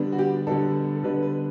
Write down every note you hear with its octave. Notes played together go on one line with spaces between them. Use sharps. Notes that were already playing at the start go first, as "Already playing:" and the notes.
Already playing: D3 G3 B3 D4
F#4
G4
D3 G3 B3 D4 A4
A4
D3 G3 B3 D4 B4
B4